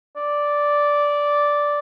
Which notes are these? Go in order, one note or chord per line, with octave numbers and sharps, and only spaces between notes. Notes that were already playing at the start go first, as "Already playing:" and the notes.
D5